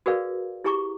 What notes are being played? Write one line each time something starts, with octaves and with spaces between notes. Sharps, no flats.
F#4 G#4 A#4 B4 D5 F5
E4 G4 G#4 A#5 C#6 D6